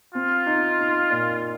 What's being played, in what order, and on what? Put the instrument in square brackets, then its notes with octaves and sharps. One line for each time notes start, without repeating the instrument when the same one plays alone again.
[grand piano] C4 [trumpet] F4
[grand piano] D#4
D#4
A#2